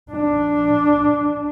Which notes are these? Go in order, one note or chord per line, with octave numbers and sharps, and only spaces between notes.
D4